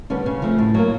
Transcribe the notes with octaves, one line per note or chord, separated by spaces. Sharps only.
D3 G3 B3 C#4
C#3 C#4
F3 A3 C4
A2
F#3 A#3